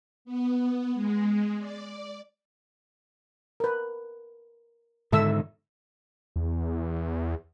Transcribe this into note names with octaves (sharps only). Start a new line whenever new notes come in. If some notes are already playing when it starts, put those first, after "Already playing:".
B3
G#3
D5
A#4 B4
G#2 D3 D#3 A4 E5 E6
E2